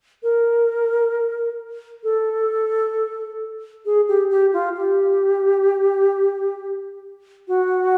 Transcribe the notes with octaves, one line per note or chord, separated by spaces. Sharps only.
A#4
A4
G#4
G4
G4
F4
G4
F#4